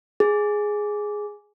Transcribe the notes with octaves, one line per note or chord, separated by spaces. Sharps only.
G#4